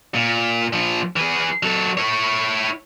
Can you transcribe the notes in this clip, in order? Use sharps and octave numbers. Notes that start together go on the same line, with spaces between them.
A#2
A#2 F3
E3 G#4
F#3 A4
E4 C#5